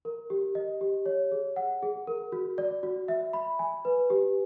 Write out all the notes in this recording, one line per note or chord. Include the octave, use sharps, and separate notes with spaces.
A#4
G4
D#5
G4
C#5
G#4
F#5
G#4
A#4
F#4
D5
F#4
E5
B5
G#5
B4
G4